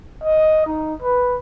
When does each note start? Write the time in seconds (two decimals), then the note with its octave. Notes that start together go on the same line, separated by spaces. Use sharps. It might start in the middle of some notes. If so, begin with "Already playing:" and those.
0.23 D#5
0.66 D#4
1.02 B4